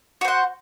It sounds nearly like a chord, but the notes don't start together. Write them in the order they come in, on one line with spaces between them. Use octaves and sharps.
F#4 C5 F#5